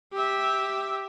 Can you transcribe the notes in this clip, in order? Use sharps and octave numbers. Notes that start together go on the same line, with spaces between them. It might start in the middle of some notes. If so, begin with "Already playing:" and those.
G4 E5